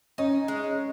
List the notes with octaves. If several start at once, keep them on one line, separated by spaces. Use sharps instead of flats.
C#4 D#4
G#3